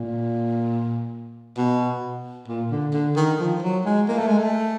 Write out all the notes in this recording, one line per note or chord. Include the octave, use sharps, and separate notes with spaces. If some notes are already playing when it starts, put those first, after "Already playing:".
Already playing: A#2
B2
A#2
D3
D3
D#3
F3
F#3
G#3
A#3
A3
G#3
A3